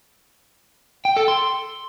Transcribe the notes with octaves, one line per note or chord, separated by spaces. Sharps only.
G5
A4
C6